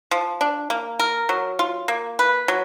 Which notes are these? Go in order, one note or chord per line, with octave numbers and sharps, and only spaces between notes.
F3
D4
A#3
A#4
F#3
F4
A#3
B4
F#3